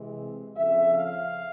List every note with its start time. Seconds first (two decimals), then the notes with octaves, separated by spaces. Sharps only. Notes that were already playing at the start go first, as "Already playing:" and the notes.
Already playing: C3 E3 G#3 C4
0.56 F2 C#3 F3 E5
0.92 F5